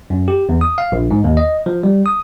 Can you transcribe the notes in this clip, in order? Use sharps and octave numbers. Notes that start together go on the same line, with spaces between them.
F#2
G4
E2
D#6
F5
A#1
G#2
D#2
D#5
F3
G3
D#6